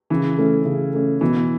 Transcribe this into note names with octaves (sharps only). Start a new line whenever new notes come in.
C#3 E3
A3 C#4
C#3
A3 C#4
B2 E3